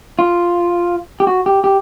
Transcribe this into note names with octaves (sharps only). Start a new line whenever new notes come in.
F4
G4
F#4
G4
G4